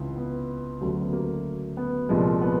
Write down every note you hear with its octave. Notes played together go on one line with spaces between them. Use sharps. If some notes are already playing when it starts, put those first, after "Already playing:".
Already playing: C#2 C3 E3
B3
D2 C#3 F#3 A3
B3
A#3
B3
C2 A#2 F3 G#3
B3